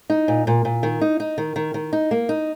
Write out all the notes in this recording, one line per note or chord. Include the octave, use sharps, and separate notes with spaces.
D#4
A#2
A#2
A#2
D#3
D#4
D#4
D#3
D#3
D#3
D#4
A#3
D#4